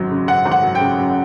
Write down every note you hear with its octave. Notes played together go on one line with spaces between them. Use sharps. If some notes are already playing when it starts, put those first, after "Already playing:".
Already playing: G#1 F#2 F#3
C#3
F#2 F#5
G#1
F#5
F#3
G5
C#3
F#2